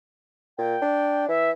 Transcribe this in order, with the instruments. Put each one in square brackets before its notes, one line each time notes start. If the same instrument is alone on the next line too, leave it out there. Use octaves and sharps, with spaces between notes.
[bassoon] A#2 [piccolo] G5
[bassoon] D4
[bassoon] E3 [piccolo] E5